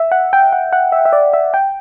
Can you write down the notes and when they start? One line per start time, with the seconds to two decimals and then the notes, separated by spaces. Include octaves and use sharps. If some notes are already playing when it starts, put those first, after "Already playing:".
Already playing: E5
0.12 F#5
0.33 G5
0.52 F#5
0.73 F#5
0.92 E5
1.05 E5
1.13 D5
1.33 E5
1.54 G5